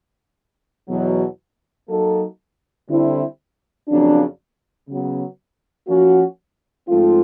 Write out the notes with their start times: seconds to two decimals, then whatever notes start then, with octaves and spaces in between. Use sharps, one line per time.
0.89 E2 B2 F#3
1.89 F#3 A#3 D#4 F#4 A4
2.88 D3 G3 C4 E4 A4
3.89 F2 C#3 F#3 A#3 D4
4.88 C#3 F#3 B3
5.88 F3 A#3 C#4 F#4
6.88 G#2 F3 A3 C4 F4